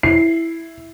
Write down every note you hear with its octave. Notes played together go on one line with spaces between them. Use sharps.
E4 C7